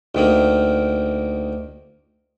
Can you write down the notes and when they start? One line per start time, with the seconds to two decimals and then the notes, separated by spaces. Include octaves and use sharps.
0.15 D2 D#3 A#3